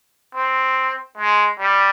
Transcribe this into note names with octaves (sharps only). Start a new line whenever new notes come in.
C4
G#3
G3